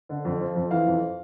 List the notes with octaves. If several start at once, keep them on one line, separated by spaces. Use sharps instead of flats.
D3
F2
F3
F2
E3 F5
F2